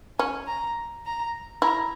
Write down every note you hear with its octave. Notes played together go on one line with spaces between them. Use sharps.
C#4 G#5
A#5
A#5
E4 A#5